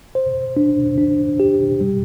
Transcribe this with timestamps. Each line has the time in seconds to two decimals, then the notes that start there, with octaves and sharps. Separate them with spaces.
0.15 C5
0.57 D4
0.98 D4
1.40 G4
1.81 G3